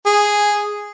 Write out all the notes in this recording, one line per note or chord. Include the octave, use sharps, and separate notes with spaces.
G#4